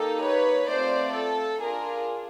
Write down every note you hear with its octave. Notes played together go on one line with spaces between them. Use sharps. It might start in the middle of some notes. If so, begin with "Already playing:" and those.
Already playing: A#3 D#4 G4 A4
B4 C#5
A3 C4 F4 C5 D5
A4
D4 F4 G#4 A#4